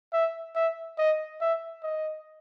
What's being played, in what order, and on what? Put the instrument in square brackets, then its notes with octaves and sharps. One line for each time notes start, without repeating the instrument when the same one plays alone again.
[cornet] E5
E5
D#5
E5
D#5